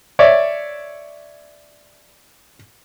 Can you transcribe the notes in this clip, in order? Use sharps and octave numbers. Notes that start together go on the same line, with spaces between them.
C#5 D5 E5